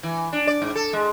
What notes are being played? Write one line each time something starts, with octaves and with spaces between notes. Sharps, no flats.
E3
D4
D5
G#2
A4
G#3